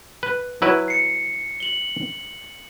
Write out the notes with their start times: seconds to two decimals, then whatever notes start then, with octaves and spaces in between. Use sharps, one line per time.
0.23 B4
0.62 F#3 E4 B4
0.88 C7 C#7
1.60 F#7 G7